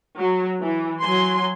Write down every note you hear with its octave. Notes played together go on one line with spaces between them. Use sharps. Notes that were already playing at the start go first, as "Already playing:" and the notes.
F#3
E3
F#3 G#5 C6